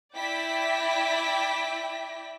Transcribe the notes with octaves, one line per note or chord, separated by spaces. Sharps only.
E4 D5 E5 G5 B6